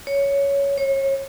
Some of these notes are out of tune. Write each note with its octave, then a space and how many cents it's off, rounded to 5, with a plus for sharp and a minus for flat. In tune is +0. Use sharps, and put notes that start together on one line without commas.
C#5 +10
C#5 -30